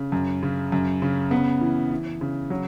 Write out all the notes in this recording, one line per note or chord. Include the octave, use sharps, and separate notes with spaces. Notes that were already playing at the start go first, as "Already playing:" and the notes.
Already playing: C#3
F#2
C#3
F#2
C#3
B3
E3
E3
C#3
F#3